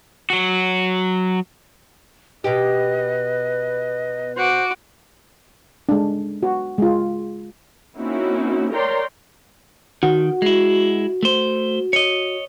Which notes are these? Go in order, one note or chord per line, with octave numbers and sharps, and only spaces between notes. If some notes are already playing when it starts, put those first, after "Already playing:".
F#3 F#4
B2 G4 B4 D#5
F#4 C5 D6
G#3 D4
F#4
G#3 F4
A#3 C4 C#4 D#4 E4 F#4
A#4 C#5 D5 G5 A#5 C6
D#3 F#4
G#3 E4
A3 C5
C#5 D#5